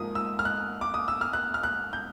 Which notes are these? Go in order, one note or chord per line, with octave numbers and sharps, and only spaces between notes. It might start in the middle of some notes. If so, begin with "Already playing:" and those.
Already playing: G#2 F3 A#3 D#6
E6
F6
F#6
D6
D#6
E6
F6
F#6
F6
F#6
G6